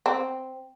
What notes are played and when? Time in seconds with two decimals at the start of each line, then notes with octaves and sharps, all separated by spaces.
0.06 C4